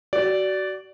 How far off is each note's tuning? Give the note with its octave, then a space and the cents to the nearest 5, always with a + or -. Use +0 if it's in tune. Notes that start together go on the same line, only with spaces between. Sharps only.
F#4 +30 D5 -10